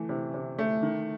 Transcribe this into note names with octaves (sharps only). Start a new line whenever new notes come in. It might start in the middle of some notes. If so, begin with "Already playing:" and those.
Already playing: E3 A3
C3
C3
A3
D#3